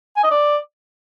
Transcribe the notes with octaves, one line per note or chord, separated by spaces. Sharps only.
G#5
D#5
D5